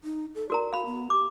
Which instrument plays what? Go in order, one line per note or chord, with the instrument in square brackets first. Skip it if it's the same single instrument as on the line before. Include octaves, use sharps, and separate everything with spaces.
[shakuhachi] D#4
A4
[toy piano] F#4 A#4 A#5 [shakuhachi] D5
[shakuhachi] F#4 [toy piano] F5 B5
[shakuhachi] B3
[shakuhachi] G4 [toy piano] D6